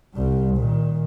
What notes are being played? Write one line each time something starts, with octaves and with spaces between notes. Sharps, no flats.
C2 G3
A#2 D#3